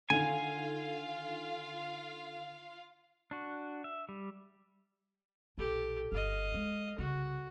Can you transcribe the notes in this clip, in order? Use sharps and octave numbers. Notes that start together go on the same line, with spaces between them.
D3 D#3 F4 F5 G#5
D4 F#4
E5
G3
B1 A#2 G4 A4
G1 D#5 F5
G#3 D#4
C2 C#3 F#4